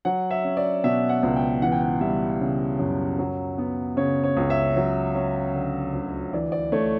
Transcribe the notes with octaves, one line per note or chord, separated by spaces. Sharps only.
F#3 F#5
E5
C#4
D5
B2 E5
F#5
C#2
G5
E3 F#5
G5
F#5
G3 E5
C#3
F#2
F#3
B3
C#3 C#5
C#5
C#2
E5
F#3
C#4
D3
D2
E3 D5
D5
A3 C#5